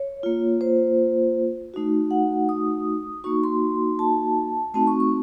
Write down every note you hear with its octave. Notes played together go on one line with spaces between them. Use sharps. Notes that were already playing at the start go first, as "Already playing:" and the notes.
Already playing: C#5
A#3 F4
C5
A3 D#4 F#4
F#5
D#6
A#3 D#4 F#4 C#6
C6
A5
A3 C4 D#4 F#4 A5
C#6
C#6